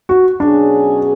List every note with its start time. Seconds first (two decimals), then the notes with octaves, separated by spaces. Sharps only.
0.09 F#4
0.40 B2 F#3 C#4 D4 G#4